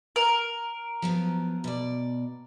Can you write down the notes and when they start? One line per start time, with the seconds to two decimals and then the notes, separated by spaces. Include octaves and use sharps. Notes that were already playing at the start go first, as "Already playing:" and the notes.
0.16 A#4
1.02 F3 F#3 B3
1.64 B2 D5